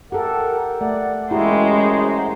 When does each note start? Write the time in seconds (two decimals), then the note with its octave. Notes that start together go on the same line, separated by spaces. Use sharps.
0.12 G4 A4 A#4 F#5
0.81 A3 D5 F#5
1.31 F#2 G#3 E4 F#4 G4 C5 A#5